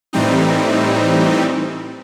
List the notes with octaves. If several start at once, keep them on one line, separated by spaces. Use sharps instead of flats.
A2 E3 G3 C4 D#4